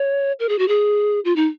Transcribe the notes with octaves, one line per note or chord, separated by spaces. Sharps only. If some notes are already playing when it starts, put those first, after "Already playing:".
Already playing: C#5
A#4
G#4
F#4
G#4
F4
D#4